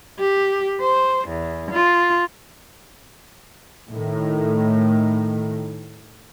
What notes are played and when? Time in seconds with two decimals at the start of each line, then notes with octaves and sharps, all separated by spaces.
0.20 G4
0.81 C5
1.28 E2
1.72 F4
3.90 A2 D#3